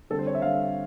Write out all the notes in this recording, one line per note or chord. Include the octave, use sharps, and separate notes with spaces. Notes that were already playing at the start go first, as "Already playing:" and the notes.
D3 G3 C4 A4
C5
C#5
E5
D3 G3 C4 F5